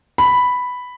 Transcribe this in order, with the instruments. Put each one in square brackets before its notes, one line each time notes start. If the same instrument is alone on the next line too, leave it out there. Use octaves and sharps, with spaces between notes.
[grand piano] B5